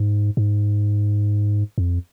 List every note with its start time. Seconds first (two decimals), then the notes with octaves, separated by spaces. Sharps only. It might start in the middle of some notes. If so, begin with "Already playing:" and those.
Already playing: G#2
0.37 G#2
1.78 F2